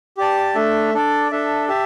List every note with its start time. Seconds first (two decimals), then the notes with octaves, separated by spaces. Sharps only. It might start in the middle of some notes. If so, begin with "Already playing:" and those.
0.17 G4 D5 A5
0.55 A3 D4 A4 E5
0.94 D4 A4 D5
1.32 D4 A4 E5
1.69 G4 E5 A5